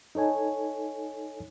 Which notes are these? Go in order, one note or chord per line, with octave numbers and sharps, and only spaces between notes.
D#4 A4 C#5 G#5